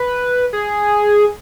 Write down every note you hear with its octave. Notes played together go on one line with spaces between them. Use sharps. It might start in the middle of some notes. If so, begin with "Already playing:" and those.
Already playing: B4
G#4